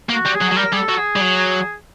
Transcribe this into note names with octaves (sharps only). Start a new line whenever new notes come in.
A#3
F#4
G3
G#4
F#3
F#3
G3 A#4
G3 G#4
A4
F#3
G#4
G3
F#3